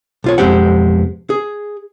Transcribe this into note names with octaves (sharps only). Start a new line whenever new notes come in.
B1 F4 C#5
B1 F2 G#3 C4 G4 F#5
G#4